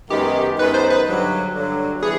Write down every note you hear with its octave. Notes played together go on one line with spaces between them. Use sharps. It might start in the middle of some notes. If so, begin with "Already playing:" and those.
F#2 D#3 G#3 B3 D#4 G4
F#2 D#3 G#3 B3 D#4 B4
C5
B4
G2 D3 F#3
G2 D3 F#3
E3 G3 B3 G#4